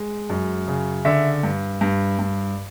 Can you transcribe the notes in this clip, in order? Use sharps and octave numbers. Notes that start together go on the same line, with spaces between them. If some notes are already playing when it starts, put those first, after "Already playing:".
Already playing: G#3
F#2
C#3
D3 E5
G2
G2
G2